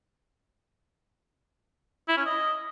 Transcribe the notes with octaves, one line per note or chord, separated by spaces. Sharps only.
E4
C#4
D#5